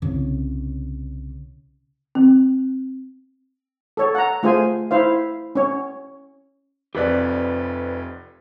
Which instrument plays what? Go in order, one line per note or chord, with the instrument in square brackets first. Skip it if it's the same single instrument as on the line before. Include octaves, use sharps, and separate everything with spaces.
[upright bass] C2 C#3
[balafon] C4
[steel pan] A4 C#5
F#5 A#5
A3 F4 G#4 C5 G#5
E4 C5 F5
C#4 C#5
[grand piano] F1 F2 [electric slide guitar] G4 B4 D5